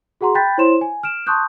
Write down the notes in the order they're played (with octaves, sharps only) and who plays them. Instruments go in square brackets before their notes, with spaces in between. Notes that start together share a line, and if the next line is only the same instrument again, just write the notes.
[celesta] F#4 G#4 F#5 A#5 C6
G5 B5 F#6 G6 A6 B6
E4 C5 C#5 C6 E7
G#5
F6 D7 E7
A5 C6 C#6 D#6 F#6 G6